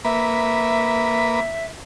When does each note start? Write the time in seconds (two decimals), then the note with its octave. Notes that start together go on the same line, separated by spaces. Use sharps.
0.05 A#3 B4 E5